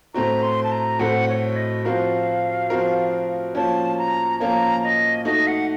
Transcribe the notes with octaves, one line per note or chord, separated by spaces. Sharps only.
A2 A3 C4 F#4 A#5
C6
A5
A#5
A2 A3 C4 F#4 F#5
C#5
D#5
F3 C4 F#4 A#4 F5
F3 C4 F#4 A#4
F3 A#3 C#4 A5
A#5
F3 A#3 C#4 A#5
D#5
A3 D#4 F#4 D#5
F#5